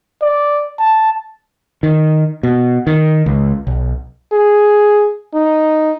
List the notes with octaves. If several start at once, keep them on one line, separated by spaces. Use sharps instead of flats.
D5
A5
D#3
B2
D#3
C#2
B1
G#4
D#4